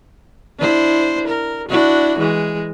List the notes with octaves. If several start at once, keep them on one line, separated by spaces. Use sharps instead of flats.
D4 E4 C5
A#4
D4 E4 F#4
E3 G#3